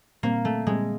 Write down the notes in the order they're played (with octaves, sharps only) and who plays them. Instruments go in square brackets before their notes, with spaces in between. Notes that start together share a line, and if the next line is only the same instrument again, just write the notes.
[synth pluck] A#2 G3 C4 [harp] A#3
[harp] A3
[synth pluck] A#2 G3 C4 [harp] G#3